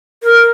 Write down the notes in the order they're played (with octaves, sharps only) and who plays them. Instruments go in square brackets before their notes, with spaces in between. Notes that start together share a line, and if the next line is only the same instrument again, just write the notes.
[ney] A#4